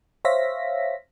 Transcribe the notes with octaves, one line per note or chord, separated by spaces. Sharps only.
C5 C#5 E5 F5 A#6 B6